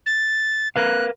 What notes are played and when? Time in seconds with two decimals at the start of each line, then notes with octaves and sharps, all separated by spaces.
0.06 A6
0.76 A#4 B4 F5 F#6